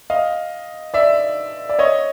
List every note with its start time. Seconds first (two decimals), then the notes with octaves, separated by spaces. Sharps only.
0.10 D#5 F5
0.94 D5 E5
1.69 D5
1.79 C#5 D#5